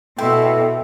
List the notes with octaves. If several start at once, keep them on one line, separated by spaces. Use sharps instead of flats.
B2 E4 A4 E5 G5 C6 E6